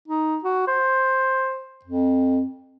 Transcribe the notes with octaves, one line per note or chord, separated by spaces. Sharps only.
D#4
F#4
C5
F2